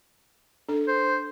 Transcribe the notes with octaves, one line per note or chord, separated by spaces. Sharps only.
D4 A4
C5